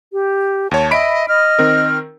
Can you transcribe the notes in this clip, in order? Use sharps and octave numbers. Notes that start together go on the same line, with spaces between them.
G4
D#2 C#5 A5
D#5 E5 B5 B6 D7
D#5 F6
D#3 C4 A#4